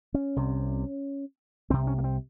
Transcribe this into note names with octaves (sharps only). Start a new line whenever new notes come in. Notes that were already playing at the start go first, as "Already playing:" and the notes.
C#4
C2 C3
C2 C3 C4
C#4
A#3
C4